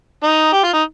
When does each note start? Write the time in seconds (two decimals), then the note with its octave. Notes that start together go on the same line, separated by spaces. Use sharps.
0.23 D#4
0.53 G4
0.63 F4
0.73 D#4